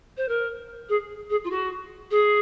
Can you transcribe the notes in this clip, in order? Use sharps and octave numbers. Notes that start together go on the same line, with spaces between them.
C5
A#4
G#4
G#4
F4
F#4
G#4